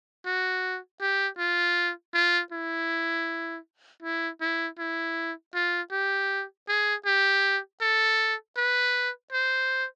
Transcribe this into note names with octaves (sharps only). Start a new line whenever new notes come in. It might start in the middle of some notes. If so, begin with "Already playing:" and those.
F#4
G4
F4
F4
E4
E4
E4
E4
F4
G4
G#4
G4
A4
B4
C5